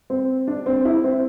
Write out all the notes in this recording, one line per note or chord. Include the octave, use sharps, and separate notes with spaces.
C4
D4
C4
E4
C4